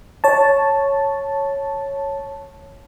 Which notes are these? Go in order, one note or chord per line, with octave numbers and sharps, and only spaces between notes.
C#5 A5